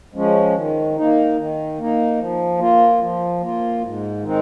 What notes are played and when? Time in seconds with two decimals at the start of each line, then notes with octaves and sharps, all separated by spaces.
0.14 F3 G#3 C#4
0.55 D#3
0.96 A#3 D#4
1.37 D#3
1.78 A#3 D#4
2.19 F3
2.59 A#3 F4
3.01 F3
3.41 A#3 F4
3.83 G#2
4.23 D#3 G#3 C4 D#4